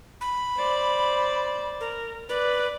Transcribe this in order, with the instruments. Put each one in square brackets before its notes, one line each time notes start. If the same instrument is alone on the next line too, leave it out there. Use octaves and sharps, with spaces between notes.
[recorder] B5
[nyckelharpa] C5 D5
[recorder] A#4
[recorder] B4 [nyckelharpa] D5